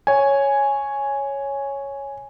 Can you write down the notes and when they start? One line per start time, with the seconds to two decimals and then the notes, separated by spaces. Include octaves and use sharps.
0.07 C#5 G#5